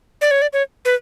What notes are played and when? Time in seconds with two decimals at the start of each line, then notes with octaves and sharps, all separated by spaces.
0.21 D5
0.31 C#5
0.42 D5
0.53 C#5
0.85 B4